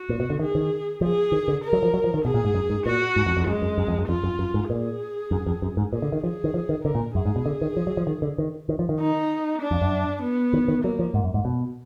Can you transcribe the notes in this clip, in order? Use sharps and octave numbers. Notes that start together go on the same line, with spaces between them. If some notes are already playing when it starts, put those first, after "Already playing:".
Already playing: F#4
A#2
B2
D3
D#3 G#4
D#3
F3 G#4
D#3
D3
A#4
F#3
F3
F#3
F3
D#3
B2 G#4
A#2
G#2
F#2
G#2
A#2 F#4
G#2
F2
F2
F#2 G#3
F#2
F#2
F2
F#2
F2 F4
F#2
F#2
G#2
A#2 G#4
F#2
F2
F#2
G#2
A#2 G#4
D3
D#3
F3 G#4
D#3
F3
D#3
D3 A#4
A#2
F#2 G#4
G#2
B2
D3
D#3
F3
F#3
F3
D#3
D3
D#3
D#3
F3
D#3
D#4
D4
F2
F#2
B3
D#3
D#3
F#3 A#3
F3
G#2
F#2
G#2
B2